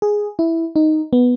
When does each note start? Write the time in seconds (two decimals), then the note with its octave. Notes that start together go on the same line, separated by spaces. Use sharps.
0.02 G#4
0.39 E4
0.76 D#4
1.13 B3